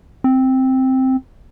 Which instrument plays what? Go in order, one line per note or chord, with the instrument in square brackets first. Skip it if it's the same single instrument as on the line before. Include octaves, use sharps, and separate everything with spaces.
[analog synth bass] C4